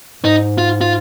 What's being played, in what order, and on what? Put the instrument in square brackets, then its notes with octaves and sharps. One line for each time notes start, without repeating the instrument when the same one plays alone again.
[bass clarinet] G#2 [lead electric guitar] D#4
[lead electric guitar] F4
F4